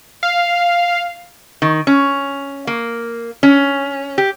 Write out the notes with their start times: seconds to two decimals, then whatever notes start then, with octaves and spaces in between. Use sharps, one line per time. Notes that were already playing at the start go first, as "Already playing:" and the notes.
0.23 F5
1.62 D#3
1.87 C#4
2.67 A#3
3.43 C#4
4.18 G4